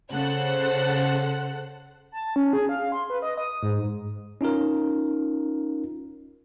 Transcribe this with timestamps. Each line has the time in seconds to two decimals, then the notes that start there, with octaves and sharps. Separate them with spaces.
0.12 C#3 A4 C5 F#5 F#6
2.12 A5
2.36 C#4
2.53 G#4
2.69 F5
2.92 C6
3.10 B4
3.22 D#5
3.38 D#6
3.63 G#2
4.41 C#4 D#4 F4 A#4